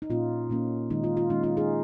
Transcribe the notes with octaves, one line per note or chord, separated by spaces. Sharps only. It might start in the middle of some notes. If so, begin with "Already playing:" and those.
D#4
A#2 A#3 C#4 F4
A#2 A#3 C#4
D#3 G#3 C#4 D#4
F4
F4
D#3 G#3 C#4 D#4
F4
D#4 G#4